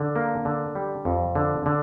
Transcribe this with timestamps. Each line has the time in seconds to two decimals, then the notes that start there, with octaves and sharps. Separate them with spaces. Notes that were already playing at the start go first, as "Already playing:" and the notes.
Already playing: D3
0.16 A#3
0.45 D3
0.75 G3
1.05 F2
1.35 D3
1.66 D3